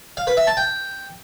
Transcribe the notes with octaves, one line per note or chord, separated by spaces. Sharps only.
F5
B4
E5
A5
G5